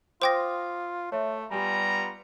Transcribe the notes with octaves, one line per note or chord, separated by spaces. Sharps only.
F4 C5 G5 C6 D6 D#6 A#6
A3 C#5 E5
G3 B3 F4 G4 G#5 A#5